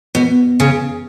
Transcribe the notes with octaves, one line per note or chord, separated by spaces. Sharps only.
B2
C#3